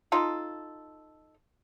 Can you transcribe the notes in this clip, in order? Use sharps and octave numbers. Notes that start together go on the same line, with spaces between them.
D#4 F4 A4